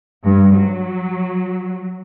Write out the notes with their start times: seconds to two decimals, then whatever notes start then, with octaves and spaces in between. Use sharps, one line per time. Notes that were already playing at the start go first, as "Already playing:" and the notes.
0.24 G2
0.55 F#3